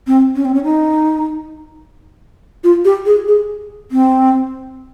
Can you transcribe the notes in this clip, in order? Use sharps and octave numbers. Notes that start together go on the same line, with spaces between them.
C4
C#4
C4
C#4
D#4
F4
G4
G#4
G#4
C4